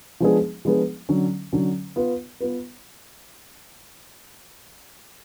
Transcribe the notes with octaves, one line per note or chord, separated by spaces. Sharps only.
F3 G#3 B3 D4 G#4
F3 G#3 B3 D4 G#4
D3 F#3 C#4
D3 F#3 C#4
B3 F4 B4
B3 F4 B4